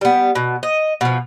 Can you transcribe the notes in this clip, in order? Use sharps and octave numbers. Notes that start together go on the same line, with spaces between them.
G3 B3
B2
D#5
B2 F3